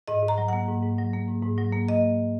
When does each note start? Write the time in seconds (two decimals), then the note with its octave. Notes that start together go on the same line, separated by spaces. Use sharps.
0.08 G#2 D#5
0.23 G#2
0.28 A#5
0.38 F#3
0.48 A#3 F#5
0.68 G#2
0.83 G#2
0.98 F#3
1.13 A#3
1.28 G#2
1.43 G#2
1.58 F#3
1.73 A#3
1.89 D#5